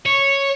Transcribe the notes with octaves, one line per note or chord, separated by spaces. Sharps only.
C#5